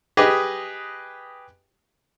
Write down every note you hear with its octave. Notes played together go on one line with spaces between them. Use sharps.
G4 G#4 B4 D#5